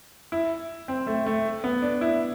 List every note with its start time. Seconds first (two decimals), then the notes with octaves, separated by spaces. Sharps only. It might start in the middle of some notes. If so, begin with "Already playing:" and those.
0.32 E4
0.88 C4
1.07 A3
1.26 A3
1.64 B3
1.82 D4
2.01 E4